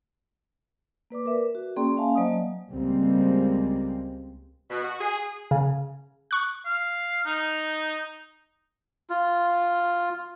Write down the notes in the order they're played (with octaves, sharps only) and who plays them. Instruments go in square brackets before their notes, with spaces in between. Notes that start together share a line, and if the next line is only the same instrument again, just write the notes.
[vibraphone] A#3 B4 D5 D6
A#4 B4 E5
F#4
A#3 C#4 G#4 D5 G5 C6
A#3 C#4 E5 F5 G#5 A5
F#3 A#3 C5 D5 D#5 D#6
[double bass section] C#2 G3 G#3 A#3 C4
[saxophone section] B2
F#4
G#4
[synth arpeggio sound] C#3
C#6 F#6
[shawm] F5
D#4
[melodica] F4